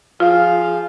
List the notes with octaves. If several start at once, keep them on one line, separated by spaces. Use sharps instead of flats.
F3 F4 G#4 F5